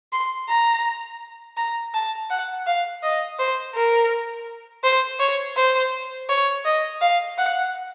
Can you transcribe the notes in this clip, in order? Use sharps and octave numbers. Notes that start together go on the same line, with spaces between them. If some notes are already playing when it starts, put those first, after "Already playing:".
C6
A#5
A#5
A5
F#5
F5
D#5
C5
A#4
C5
C#5
C5
C#5
D#5
F5
F#5